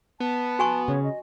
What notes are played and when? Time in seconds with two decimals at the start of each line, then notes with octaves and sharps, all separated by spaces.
0.20 B3 A5
0.59 F#4 G#5 C#6
0.88 C#3 C#5
1.04 D#5